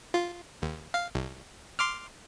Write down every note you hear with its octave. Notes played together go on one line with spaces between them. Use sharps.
F4
D#2
F5
C2
C6 D6 F6